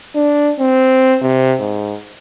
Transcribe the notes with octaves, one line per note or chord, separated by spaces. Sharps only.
D4
C4
C3
G#2